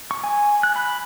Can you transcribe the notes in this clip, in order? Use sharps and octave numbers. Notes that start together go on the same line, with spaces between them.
C#6
G#5
F#6
B5